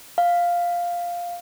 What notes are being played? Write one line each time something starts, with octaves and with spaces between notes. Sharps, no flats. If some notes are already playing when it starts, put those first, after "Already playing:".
F5